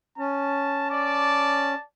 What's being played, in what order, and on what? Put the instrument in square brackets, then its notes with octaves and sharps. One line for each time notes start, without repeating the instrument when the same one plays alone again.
[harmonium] C#4 [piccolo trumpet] A5
[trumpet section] D5 A5 [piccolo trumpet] D6